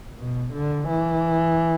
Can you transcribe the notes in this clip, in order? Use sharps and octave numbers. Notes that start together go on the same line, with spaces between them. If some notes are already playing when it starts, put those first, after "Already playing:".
B2
D3
E3